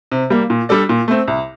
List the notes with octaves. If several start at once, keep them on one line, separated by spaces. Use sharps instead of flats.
C3
G3 A#3
A#2
G3 D4 A4 D5
A#2
A3 C4
C2